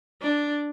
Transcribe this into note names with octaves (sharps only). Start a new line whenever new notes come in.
D4